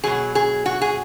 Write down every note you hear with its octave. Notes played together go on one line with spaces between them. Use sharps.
B2 F#3 G#4
G#4
F#4
G#4